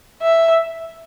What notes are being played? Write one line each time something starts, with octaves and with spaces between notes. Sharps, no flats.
E5